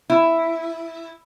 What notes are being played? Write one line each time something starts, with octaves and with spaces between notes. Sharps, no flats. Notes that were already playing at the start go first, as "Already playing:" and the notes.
E4